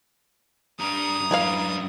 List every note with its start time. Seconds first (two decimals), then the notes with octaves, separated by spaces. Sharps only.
0.80 G2 D4 A#5 D#6
1.31 F#2 D4 E4 B4 F5